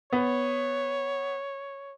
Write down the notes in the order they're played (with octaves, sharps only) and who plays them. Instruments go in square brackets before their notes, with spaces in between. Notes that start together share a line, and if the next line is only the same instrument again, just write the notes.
[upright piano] B3 [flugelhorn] C#5